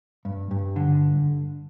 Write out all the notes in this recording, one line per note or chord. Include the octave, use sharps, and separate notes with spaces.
G2
G2
D3